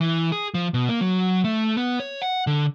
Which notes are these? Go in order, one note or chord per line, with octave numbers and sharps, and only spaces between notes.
E3
G#4
F3
B2
A#3
F#3
A3
B3
C#5
F#5
D3